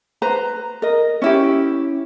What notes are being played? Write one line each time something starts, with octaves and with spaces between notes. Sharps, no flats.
B4 C5 A#5
A#4 D#5
C#4 E4 G4